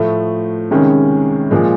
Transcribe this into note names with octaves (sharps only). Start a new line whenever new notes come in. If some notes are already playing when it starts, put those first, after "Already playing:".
Already playing: A2 F3 A3
C#2 C3 D#3 G#3 C#4
A#2 F3 G#3